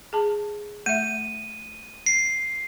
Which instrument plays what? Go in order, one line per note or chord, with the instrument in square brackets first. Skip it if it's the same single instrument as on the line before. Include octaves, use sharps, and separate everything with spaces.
[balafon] G#4 A5
[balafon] A3 E5 [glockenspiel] D#7
[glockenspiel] C7